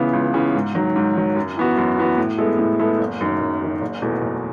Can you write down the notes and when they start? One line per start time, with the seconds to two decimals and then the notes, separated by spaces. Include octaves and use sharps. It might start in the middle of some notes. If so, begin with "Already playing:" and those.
Already playing: C#2 C#3 E3 B3
0.13 C#2
0.34 C#3 E3 B3
0.55 G#2
0.75 D#3 F#3
0.96 G#2
1.15 D#3 F#3
1.36 F#2
1.57 E3 B3 F#4
1.77 F#2
1.98 E3 B3 F#4
2.18 A2
2.38 G#3 B3 E4 A4
2.59 A2
2.79 G#3 B3 E4 A4
2.99 F#1
3.21 F#2 D#3
3.40 F#1
3.61 F#2 D#3
3.81 F#1
4.02 E2 B2 A3
4.22 F#1